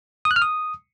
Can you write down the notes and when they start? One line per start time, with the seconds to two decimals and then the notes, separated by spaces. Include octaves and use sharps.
0.25 D#6
0.31 F#6
0.36 F6
0.42 D#6